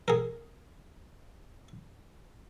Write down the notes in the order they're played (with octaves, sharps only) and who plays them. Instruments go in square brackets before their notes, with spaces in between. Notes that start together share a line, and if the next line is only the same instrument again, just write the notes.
[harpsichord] G#4 A#4